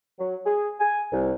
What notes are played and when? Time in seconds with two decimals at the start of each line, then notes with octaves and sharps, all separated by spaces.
0.19 F#3
0.46 G#4
0.80 G#5
1.12 C2